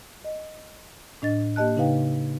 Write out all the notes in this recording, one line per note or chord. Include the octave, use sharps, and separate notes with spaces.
D#5
A2 D4 D#5 A6
A#3 G4 D#5 A5 F#6
C#3 D#4 B4 F5 G5